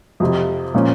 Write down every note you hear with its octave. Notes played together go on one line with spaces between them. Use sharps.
F2 C3 F3
A#2 F3 A#3 C#4